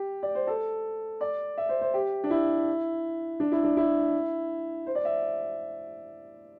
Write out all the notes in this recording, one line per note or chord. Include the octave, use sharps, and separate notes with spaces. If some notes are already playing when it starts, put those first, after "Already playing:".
Already playing: G4
D5
C5
A4
D5
E5
C5
C5
G4
D4
E4
D4
E4
D4
E4
C5
D5
E5